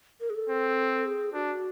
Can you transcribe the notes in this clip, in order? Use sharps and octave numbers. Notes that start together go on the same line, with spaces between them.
A#4
G#4
A4
C4
G#4
D4 F#4